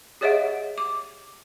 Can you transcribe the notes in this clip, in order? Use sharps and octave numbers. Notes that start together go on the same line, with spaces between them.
G4 G#4 C#5 D#5 E5 F#5
D6